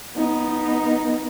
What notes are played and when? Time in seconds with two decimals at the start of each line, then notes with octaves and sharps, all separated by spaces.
0.17 B3 D#4